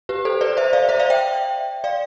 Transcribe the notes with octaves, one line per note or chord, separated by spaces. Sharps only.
G4 B4
A4 C5
B4 D5
C5 E5
D5 F5
C5 E5
D5 F5
E5 G5
D5 F5